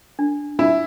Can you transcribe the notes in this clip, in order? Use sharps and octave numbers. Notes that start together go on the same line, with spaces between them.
D4
D4 E4